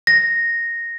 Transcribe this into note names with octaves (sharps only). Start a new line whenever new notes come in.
A#6